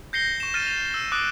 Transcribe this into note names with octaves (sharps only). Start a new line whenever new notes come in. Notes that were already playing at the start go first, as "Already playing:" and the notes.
G6 A#6 C7 C#7 G7
C#6 E7
F6 A6 A#6 C#7 D#7
F7
E6
D6 D#6 F#6 A6 C7 D7